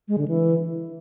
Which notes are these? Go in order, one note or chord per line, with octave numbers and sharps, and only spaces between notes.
G#3
D3
E3